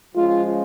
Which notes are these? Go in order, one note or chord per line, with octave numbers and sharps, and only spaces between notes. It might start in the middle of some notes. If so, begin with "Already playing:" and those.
F3 G#3 C#4 F4